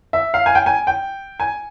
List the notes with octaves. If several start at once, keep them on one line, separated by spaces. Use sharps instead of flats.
E5
F5
G#5
G5
G#5
G5
G#5